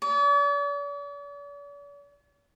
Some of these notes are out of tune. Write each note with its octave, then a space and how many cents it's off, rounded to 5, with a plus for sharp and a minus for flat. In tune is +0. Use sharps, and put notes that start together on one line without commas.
D5 -45